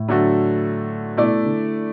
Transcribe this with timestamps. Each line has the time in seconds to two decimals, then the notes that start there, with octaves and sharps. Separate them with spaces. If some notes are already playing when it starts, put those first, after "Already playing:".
Already playing: A2
0.08 D3 F#3 A3 F#4
1.17 B2 A3 E4 D5
1.45 D3